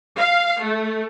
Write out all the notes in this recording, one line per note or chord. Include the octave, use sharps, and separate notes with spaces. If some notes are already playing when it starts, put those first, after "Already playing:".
F5
A3